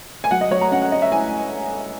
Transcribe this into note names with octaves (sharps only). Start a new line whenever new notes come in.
G#5
F#3 F#5
D#5
F#3 C#5
A#5
C#4 F#5
F#5
C#4 D#5
E5
E4 G#5